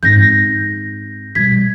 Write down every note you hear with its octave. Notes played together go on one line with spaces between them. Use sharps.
G#2 C4 G6 A#6
B2 G3 G#6 B6